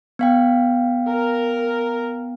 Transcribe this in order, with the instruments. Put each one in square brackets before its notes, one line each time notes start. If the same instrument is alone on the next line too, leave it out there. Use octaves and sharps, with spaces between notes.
[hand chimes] B3 F5 G5
[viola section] A#4